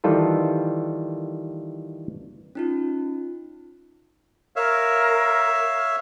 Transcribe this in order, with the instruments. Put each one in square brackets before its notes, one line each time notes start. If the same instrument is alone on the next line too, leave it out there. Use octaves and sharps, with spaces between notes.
[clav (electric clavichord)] D#3 E3 G3 F4 A4 B4
[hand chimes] C#4 D#4 F4
[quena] A#4 [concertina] C#5 E5 F5